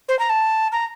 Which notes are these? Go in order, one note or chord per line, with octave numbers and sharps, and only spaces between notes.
C5
A#5
A5
A#5